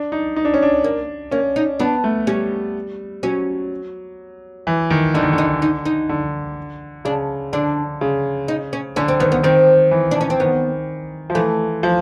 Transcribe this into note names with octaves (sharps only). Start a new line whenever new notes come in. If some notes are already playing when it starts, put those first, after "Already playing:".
Already playing: D4
D#4
D#4
D4
C#4
D4
A#3
A#3 C#4
D#4
B3 D4
A3
G3 C#4
F#3 C#4
E3
D#3
D3 D#4
D#3
D3
D#4
D#4
D#4
D3
C#3 D4
D3 D4
C#3
D#4
C#4
D3 C#4
C4
D#3 B3
B3
D#3 C4
E3
D4
C#4
C4
D#3 B3
F3
E3 A3
F3